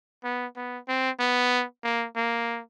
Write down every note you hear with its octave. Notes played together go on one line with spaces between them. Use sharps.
B3
B3
C4
B3
A#3
A#3